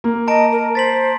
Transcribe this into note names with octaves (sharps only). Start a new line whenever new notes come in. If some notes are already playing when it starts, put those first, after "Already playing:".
A#3
D#5 A5 A#5 D7
A#4
C5 A6 B6 F#7